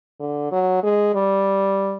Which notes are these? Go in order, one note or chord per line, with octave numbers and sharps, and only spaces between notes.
D3
F#3
G#3
G3